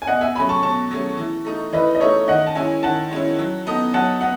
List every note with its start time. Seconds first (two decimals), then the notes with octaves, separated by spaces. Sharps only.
0.02 G#5
0.07 B2 D#5 F#5
0.21 E5 G#5
0.35 F#3 A3 C#4 G#4 G#5 B5
0.49 A5 C#6
0.63 B2 A5 C#6
0.91 F#3 A3 C#4 G#4
1.17 E3
1.45 A3 D#4
1.73 E3 B4 D#5
1.95 D#5
2.00 A3 D#4 C#5 E5
2.28 D#3 D#5 F#5
2.47 A5
2.55 G#3 C#4 E4 E5 G#5
2.83 D#3 F#5 A5
3.11 G#3 C#4 E4
3.39 F#3
3.66 B3 D#4 A4 D#5
3.94 F#3 F#5 A5
4.21 B3 F#5